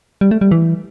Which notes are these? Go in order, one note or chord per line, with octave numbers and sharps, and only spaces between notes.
G3
A3
G3
E3